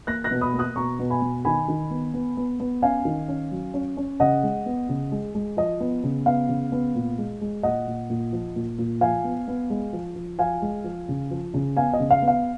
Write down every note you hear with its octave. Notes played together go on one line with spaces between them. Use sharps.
A#3 F#6 A#6
F#6 A#6
B2
B5 D#6
A#3
D#6 F#6
B2 A#5 C#6
B2
G#5 B5
B2
D#3 G#5 B5
D#3
B3
B3
B3
B3
C#4 F5 G#5
D#3
C#4
F#3
C#4
C#4
C#3 D#5 F#5
G#3
B3
C#3
G#3
G#3
F3 D#5
B3
C#3
B3 F5
C#3
B3
A#2
G#3
G#3
A#2 D#5 F#5
A#2
A#2
F3
A#2
A#2
F3 F5 G#5
B3
B3
G#3
F3
F3
F3 F5 G#5
G#3
F3
C#3
F3
C#3
B3 F5 G#5
D#5
C#3
F5
B3
F5